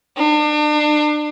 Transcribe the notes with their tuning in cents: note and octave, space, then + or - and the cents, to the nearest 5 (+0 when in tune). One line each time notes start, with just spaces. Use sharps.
D4 +35